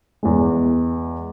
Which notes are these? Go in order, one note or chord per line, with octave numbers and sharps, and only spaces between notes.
E2 G#3